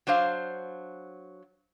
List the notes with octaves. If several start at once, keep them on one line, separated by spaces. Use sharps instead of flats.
F#3 D4 C5 F5